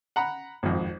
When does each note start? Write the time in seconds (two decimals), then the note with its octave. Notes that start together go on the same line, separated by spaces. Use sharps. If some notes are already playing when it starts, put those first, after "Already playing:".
0.16 F#5 A#5 B5
0.63 G#1 F2